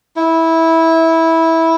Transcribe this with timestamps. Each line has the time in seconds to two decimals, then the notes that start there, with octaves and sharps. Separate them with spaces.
0.16 E4